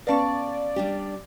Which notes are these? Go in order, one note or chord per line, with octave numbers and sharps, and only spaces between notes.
B3 C#4 B4 D5 F5 A5 C#6
G3 D4 G4